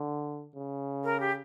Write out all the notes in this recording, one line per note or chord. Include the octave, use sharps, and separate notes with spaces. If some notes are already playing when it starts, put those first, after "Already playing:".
Already playing: D3
C#3
A#4
G4